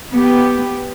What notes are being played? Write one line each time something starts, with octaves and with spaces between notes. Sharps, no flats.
B3 G4